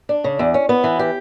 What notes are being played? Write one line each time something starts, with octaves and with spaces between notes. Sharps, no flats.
D4
C#3
E2
C#4
B3
E3
G4